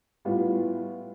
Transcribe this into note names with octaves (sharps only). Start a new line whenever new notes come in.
A2 G3 B3 F4